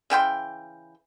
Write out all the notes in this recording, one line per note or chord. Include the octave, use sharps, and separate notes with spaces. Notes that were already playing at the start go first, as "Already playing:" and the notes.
C#3 E3 G5 C6